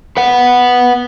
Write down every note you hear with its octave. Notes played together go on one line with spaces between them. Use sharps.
B4 F#5